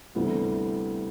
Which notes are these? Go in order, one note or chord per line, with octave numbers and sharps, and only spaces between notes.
D2 C3 E3 G3 B3